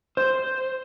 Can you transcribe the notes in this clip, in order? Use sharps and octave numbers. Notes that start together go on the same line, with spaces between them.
C5